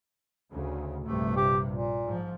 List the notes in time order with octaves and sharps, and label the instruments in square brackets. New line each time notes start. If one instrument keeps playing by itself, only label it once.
[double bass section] D2 C#3
[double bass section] A#1 G2 C3 [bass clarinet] A3
[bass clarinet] G4
A#2
[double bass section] G#2 F3